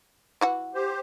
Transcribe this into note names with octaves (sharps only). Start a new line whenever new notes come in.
E3 F#4 F#5
G4 C5